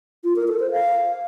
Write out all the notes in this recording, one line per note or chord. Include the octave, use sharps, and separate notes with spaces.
F4
A#4
A4
C5
F5